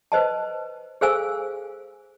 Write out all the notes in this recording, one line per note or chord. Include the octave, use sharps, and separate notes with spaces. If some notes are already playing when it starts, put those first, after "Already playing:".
B4 C5 D#5 A5
G#4 A4 C5 F5 G#5 E6